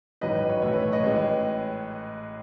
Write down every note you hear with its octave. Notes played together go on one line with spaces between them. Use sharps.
A1 G#2 F#3 B4 D#5
B4
C#5
B1 A2 E3 A3 C#5
B4
C#5
B4 D#5
A1 A2 G#3